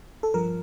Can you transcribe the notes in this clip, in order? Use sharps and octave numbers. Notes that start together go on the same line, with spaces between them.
A4
G2 F3 A#4